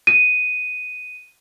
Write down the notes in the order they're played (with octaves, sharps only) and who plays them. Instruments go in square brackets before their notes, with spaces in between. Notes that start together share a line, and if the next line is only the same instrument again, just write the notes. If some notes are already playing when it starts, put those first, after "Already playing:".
[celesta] D#7